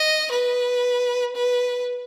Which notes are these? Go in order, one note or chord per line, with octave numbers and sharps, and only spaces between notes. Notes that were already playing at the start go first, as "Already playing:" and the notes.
Already playing: D#5
B4
B4